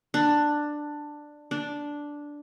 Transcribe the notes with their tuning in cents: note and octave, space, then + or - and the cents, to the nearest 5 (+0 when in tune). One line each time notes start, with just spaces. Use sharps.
D4 +10
D4 -5